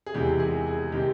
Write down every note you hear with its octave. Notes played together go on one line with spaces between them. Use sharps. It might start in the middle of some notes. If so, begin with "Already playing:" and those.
G#4
E2 C3 D#3 G#3 G4
G#4
G#4
C3 D#3 G#3 G4